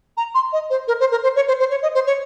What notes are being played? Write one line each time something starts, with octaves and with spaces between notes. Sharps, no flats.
A#5
C6
D#5
C5
A#4
C5
A#4
C5
C#5
C5
C5
C#5
D#5
C5
C#5